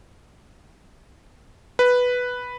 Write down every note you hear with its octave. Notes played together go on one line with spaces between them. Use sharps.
B4